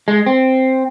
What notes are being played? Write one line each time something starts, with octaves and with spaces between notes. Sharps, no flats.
G#3
C4